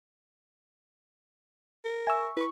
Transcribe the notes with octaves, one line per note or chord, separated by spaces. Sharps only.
A#4
E5 G#5 C#6 E6
E4 B4 B5 C#6